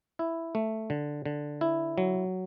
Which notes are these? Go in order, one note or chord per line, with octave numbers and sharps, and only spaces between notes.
E4
A3
D3
D3
E4
F#3